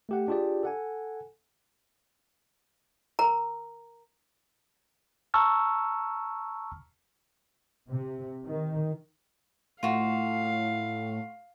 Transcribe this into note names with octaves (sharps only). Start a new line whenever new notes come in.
A3 G4 F#5
D4 F4 G4 G#4 D5
A4 F#5 G#5
A#4 A#5
A5 A#5 C#6 E6 F6
C3
D#3
A2 F4 F#4 F5